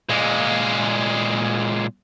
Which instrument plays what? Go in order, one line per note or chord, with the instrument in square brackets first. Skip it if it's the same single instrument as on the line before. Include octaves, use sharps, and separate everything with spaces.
[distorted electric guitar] A#2 G#3